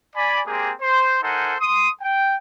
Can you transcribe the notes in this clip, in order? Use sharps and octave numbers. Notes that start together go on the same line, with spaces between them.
D5 G#5 B5
G#3 A#3 C4 G4 G#4
C5
D#4 A4 A#4 C5 F#5 G#5
C6 D#6
G5